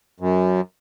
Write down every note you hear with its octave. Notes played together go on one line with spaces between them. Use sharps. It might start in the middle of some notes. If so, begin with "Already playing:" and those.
F#2